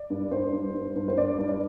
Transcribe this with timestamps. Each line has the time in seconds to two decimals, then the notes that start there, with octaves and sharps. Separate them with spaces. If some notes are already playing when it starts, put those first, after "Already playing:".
Already playing: D5
0.10 G2
0.31 G2 C5
0.53 G2
0.74 G2
0.96 G2
1.08 C5
1.18 G2 D5
1.39 G2
1.49 D5